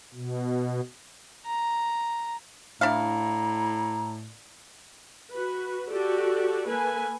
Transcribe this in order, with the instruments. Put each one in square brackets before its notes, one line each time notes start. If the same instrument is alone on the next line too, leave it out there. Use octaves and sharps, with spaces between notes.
[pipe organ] B2
[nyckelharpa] A#5
[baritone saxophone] A2 [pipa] D4 E4 F5 [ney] A#5
[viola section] F#4 B4
F#4 G4 A4 D5
A#3 A4 B4 G#5